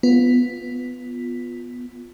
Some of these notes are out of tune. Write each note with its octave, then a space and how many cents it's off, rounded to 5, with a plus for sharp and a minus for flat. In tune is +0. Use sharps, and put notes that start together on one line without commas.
B3 +0 F4 +0